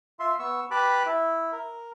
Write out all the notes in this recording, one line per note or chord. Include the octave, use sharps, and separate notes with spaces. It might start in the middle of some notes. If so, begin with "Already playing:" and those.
F4 E5 C6
B3 C#6 E6
G4 B4 A5 B5 D6 F#6
E4
A#4